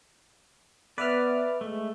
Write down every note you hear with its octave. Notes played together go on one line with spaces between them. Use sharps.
B3 B4 D5 E5 F6
G#3 A3